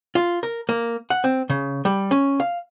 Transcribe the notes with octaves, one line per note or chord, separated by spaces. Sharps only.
F4
A#4
A#3
F#5
C4
C#3
G3
C#4
F5